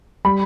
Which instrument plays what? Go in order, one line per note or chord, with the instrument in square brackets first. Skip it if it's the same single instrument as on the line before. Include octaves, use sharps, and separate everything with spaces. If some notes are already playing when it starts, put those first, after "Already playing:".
[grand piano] G3 B5